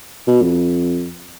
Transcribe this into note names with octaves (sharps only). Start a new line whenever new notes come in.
B2
F2